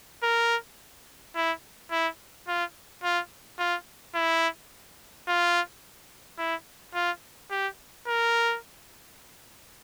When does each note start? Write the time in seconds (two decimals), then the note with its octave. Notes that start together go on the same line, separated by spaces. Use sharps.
0.23 A#4
1.35 E4
1.91 E4
2.48 F4
3.04 F4
3.59 F4
4.15 E4
5.28 F4
6.38 E4
6.94 F4
7.51 G4
8.07 A#4